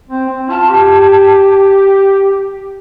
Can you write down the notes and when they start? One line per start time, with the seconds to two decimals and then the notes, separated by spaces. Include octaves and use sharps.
0.10 C4
0.30 C4
0.50 F4 A5
0.70 G4